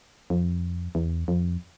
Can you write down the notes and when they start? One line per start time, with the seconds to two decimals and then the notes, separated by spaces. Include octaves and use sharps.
0.30 F2
0.95 E2
1.28 F2